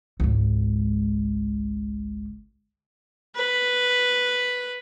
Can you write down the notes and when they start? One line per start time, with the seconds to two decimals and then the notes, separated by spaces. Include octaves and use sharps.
0.20 G#1 C#2
3.36 B4